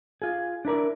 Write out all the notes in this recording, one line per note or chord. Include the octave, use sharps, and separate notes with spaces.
F4 G#4
D4 E4 A#4 D5